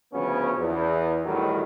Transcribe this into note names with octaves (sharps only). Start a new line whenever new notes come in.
D2 C#3 F3 B3 C#4
E2
B1 E2 A2 D#3 F#3 G3